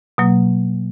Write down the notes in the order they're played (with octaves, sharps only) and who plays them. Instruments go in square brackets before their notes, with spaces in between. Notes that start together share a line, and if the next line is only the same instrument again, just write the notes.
[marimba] B2 F#3 A#3